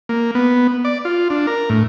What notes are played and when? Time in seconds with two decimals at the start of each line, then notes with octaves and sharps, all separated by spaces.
0.09 A#3
0.35 B3
0.85 D5
1.05 F4
1.30 D4
1.47 A#4
1.69 A2